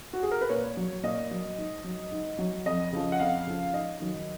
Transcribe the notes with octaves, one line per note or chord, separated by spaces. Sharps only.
F#4
G#4
A#4
B4
A#2 C#5
F#3
A#2 D#5
F#3
G#2
F#3
G#2
F#3
F2 D#5
C#3 F3
F#5
F2 F5
C#3 F3
G#2 D#5
D#3 F#3